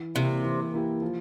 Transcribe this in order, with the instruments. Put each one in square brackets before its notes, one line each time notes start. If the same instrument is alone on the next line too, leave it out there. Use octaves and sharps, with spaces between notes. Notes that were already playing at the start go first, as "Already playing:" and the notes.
Already playing: [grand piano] E3
[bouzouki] C3 [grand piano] A#3 E4 G4
[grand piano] E3
A#3 E4 G4
F3